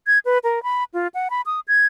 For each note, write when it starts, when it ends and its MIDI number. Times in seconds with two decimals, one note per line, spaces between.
0.07 0.19 92
0.25 0.38 71
0.44 0.62 70
0.63 0.84 83
0.94 1.08 65
1.14 1.28 78
1.30 1.41 83
1.46 1.60 87
1.68 1.86 92